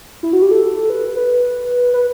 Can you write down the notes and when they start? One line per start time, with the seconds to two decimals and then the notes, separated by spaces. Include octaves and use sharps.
0.23 E4
0.33 F#4
0.42 G4
0.51 A4
0.90 B4
1.16 B4
1.94 B4